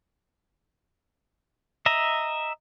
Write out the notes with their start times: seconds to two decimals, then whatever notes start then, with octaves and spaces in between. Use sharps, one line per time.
1.86 D#5 E5 A#5